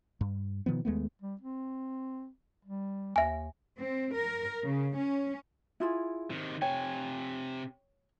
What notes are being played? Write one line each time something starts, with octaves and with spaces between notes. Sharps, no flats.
G2
B2 D#3 F3 B3
D#2 G#3 A3 B3
G3
C4
G3
D#2 E5 G#5
C4
A#4
C#3
C#4
E4 F4 G#4
C3 D#3
C3 C#5 G5 G#5